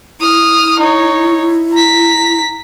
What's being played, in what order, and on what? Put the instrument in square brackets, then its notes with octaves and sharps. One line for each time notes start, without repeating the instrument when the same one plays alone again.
[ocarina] E4 [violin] D#6 F6
[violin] D#4 C#5
A#5 B6